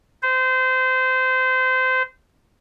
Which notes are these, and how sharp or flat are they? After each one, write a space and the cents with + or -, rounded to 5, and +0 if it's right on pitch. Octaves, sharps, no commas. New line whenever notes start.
C5 -25